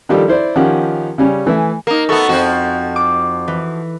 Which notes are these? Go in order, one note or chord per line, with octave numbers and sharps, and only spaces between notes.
D#3 F3 G3 D4 G4 A4
E4 C5 D5
D#3 F3 C#4 G4 F#5
C#3 G3 C#4
E3 A3 E5 G#5
A#3 D#4 A#4
A3 B3 F#4 A4 C#6
F2 F3 F#4
D6
E3